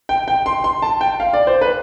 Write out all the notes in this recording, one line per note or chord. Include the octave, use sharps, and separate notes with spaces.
G5
G5
C6
C6
A5
G5
F5
D5
C5
B4